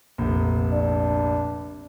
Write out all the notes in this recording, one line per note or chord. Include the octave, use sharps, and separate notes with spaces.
F1 A#1
D4